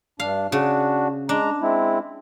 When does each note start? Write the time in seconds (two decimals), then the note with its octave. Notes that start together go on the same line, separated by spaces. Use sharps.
0.20 G2 D4 F5
0.52 C#3 D4 F#4
1.29 G#3 D4 A#5
1.62 G#3 C4 E4